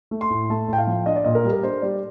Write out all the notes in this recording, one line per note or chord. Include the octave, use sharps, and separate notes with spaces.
A3
C6
A2
A3 A5
A2 G5
F5
F3
D4 D#5
D5
A#2 D#5
A#4
G3
A#4
D4 C5
G3 D5